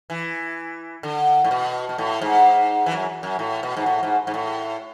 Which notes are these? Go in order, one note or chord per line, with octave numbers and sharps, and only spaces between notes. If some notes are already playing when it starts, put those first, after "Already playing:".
E3
D3
A2
B2
B2
A2
G#2
E3
F#2
F#2
A2
B2
G#2
A2
G#2
G#2
A2